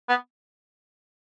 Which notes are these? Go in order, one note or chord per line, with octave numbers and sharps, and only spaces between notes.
B3